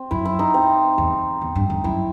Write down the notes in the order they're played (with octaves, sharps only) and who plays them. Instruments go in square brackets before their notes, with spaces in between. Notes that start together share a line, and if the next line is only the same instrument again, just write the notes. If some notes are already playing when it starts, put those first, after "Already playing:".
Already playing: [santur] C4
[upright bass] F#2 [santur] E4
[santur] E4
D#4
C4
[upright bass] E2
E2
G2
E2
[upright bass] F#2 [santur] E4